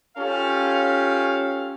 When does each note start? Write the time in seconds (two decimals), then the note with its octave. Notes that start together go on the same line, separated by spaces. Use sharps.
0.17 C#4 F4 G4 A4 F5